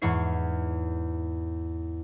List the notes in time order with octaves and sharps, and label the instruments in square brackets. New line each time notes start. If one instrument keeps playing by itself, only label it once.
[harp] E2 G#2 E4 C#5 C7